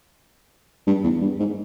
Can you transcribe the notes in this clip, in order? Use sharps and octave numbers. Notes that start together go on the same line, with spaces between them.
G2
E2
G2
G#2